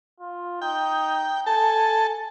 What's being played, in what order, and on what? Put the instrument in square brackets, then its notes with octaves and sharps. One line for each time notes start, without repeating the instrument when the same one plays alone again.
[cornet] F4
[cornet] D#4 [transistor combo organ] G5
[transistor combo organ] A4 A5 [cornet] G#5